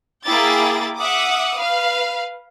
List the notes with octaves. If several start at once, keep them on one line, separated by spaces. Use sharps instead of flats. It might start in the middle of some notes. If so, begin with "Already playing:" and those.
A#3 E4 G#4 G5 D6 A6
E5 F#5 D6 D#6
B4 F5